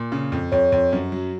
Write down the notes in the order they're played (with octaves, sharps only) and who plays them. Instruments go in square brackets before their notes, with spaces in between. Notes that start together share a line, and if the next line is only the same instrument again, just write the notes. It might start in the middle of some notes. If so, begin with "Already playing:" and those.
Already playing: [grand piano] A#2
C#3
F2
[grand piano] F2 [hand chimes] C#5
[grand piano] F2
F#2
F#3